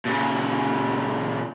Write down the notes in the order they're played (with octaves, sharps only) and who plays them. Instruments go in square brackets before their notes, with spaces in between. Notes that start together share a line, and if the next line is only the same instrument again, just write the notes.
[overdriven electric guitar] A#2 C#3